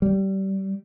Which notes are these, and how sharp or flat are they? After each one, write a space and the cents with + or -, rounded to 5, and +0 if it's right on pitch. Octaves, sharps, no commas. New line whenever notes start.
G3 -25